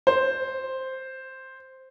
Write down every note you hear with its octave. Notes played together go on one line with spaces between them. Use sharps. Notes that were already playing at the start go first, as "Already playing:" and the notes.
C5